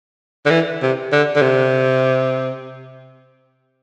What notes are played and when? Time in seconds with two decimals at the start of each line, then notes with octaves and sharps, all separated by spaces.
0.46 D3
0.51 E3
0.82 C3
1.12 D3
1.36 D3
1.42 C3